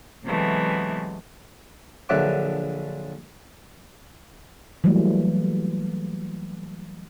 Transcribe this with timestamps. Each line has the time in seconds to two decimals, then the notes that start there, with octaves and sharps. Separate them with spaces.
0.25 C3 E3 F#3 G#3 A3 B3
2.09 A#1 D3 F#3 E5 F#5 D6
4.84 E3 F#3 G3 A3 A#3